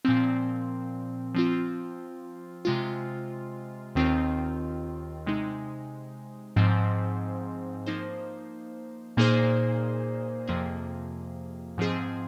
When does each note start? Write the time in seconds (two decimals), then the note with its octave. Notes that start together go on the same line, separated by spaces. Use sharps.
0.05 A#2 F3 C4
1.35 F3 C4 F4
2.65 C3 G#3 F4
3.95 D#2 D#3 C4 F4
5.26 C3 G#3 D#4
6.56 G#2 F3 C4
7.86 F3 A#3 D#4 C5
9.17 A#2 A#3 D#4 G#4 C5
10.47 F2 C3 F3 A#3 G#4
11.78 G#2 F3 C4 G#4